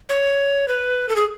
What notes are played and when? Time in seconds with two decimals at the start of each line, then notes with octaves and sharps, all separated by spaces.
0.09 C#5
0.68 B4
1.09 A4
1.16 G#4